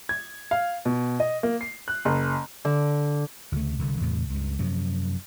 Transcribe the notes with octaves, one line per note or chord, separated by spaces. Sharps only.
G#6
F5
B2
D#5
A#3
C7
F#6
F#1
D3
D2 C#3 A3
C2 D3
E2 A2 C3
C#2 G2
F#2 C3 F3